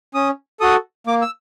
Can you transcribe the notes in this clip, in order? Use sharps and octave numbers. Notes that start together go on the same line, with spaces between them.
C#4 D#6
F#4 A4 D#6
A#3 D6
E6